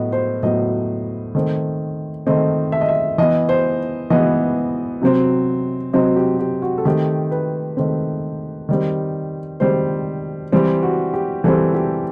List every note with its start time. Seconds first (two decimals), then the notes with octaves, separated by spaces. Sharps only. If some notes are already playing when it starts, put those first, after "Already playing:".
Already playing: A2 F#3 B3 D#5
0.12 C5
0.43 A2 F#3 B3 D#5
1.35 D#3 A3 C4
2.27 D#3 A3 C4 D#5
2.72 E5
2.81 D#5
2.89 E5
3.18 E3 B3 D#5
3.49 C5
4.10 E3 B3 D#5
5.02 C3 F#3 C4
5.93 C3 F#3 C4 D#5
6.16 G4
6.39 G4
6.62 F#4
6.78 A4
6.85 D#3 A3 C4 G4
7.31 B4
7.77 D#3 A3 C4
8.69 D#3 G3 C4
9.60 D#3 G3 C4 C5
10.52 E3 G3 C4
10.83 F#4
11.14 G4
11.44 E3 G3 C4 A4
11.74 G4